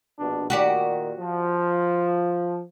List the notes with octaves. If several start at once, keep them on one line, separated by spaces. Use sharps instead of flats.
A#1 B2 D4
A#2 D#3 F#4 G4 D5
F3